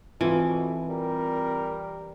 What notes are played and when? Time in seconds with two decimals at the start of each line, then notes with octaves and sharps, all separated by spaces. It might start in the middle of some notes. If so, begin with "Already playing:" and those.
0.21 B2 E3 A3 C4 F4
0.90 G3 A#4